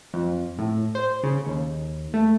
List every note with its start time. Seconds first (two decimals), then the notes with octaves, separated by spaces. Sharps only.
0.14 F2
0.58 A2
0.95 C5
1.23 C#3
1.46 D#2
2.14 A3